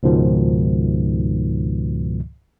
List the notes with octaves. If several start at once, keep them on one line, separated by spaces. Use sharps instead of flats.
C#2 G#2 B2 D#3 F3